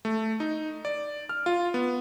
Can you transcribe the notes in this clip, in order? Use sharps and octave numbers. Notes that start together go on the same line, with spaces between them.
A3
D#4
D5
F6
F4
B3